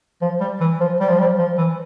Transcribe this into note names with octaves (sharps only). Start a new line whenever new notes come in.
F3
G3
E3
F3
G3
F3
G3
F3
E3